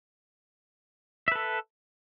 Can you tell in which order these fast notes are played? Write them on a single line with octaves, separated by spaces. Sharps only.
E5 B4 A4